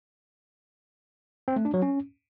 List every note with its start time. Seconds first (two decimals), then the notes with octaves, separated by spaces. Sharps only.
1.48 C4
1.56 A3
1.65 D4
1.74 F#3
1.82 C#4